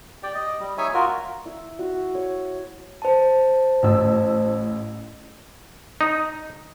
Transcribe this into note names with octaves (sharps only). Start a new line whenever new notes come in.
G4 D5 G5
D#5
G3
D#4 C#5 E5 G#5
F4 F#4 A#4
E4
F#4
C#5
C5 A5
A1 E6
D#4